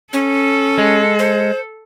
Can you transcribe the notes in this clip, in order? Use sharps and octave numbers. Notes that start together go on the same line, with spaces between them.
C#4 A4
G#3
C5